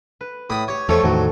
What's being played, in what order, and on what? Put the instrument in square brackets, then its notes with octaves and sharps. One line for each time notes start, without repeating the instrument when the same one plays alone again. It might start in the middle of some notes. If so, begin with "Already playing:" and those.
[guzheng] B4
[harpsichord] A2 B5 D#6
[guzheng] G4 [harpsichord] C#5
[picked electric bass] E2 [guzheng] F3 G3 A3 [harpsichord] A4 C#5
[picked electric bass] E2 A2 D#3 [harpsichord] F#3